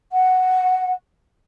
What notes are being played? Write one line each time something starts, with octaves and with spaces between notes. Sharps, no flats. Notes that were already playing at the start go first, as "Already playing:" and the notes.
F#5